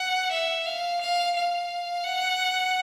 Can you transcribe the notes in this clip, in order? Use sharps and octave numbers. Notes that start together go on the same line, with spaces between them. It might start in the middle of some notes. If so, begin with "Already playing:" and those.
Already playing: F#5
E5
F5
F5
F5
F#5